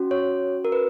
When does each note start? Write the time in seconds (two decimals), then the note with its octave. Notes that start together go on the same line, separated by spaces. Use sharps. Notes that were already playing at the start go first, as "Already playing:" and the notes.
Already playing: C#4 F#4
0.11 C#5
0.65 A#4
0.72 B4